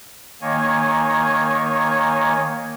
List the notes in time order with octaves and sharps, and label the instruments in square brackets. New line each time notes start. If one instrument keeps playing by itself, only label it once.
[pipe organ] D#3 A#3 C#5 G#5